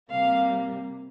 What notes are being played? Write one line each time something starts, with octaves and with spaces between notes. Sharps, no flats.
C3 G3 A#3 F5